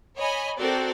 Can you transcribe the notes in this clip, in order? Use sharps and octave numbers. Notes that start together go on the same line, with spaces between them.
C#5 D#5 G#5 B5
C4 F#4 A4 A#4 D5 G5